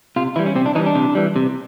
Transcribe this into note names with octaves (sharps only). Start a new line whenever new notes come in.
C3 F4
E3 G3 E4
C#4
C3 C4
D4
E3 G3 D#4
D4
C3
E3 G3
C3